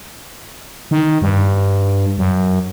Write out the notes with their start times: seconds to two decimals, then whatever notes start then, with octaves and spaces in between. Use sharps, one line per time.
0.91 D#3
1.22 G2
2.18 F#2